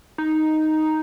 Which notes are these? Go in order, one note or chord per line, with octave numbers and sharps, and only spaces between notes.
D#4